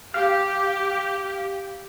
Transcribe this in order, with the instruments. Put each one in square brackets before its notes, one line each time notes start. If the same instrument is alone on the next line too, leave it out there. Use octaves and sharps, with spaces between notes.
[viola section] G4 [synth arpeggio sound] F5